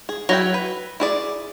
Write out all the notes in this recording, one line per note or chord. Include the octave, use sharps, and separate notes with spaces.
G#4
F#3 E4 G5
B4
E4 G#4 D5